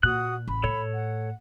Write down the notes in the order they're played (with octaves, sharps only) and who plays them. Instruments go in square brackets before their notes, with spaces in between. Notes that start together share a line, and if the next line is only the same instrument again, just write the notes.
[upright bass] A#2 [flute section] F#4 F#5 D#6 [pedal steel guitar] F#6
[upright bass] A1 [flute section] B5
[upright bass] A2 [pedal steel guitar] A4 C#5
[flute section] F#5